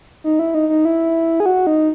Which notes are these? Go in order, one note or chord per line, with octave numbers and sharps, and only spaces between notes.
D#4
E4
D#4
D#4
E4
G#4
F#4
D#4